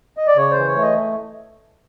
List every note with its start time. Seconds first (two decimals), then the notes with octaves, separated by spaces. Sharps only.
0.17 D#5
0.27 D5
0.36 C#3 C#5
0.51 C5
0.57 E3
0.67 C#5
0.77 A3
0.82 D#5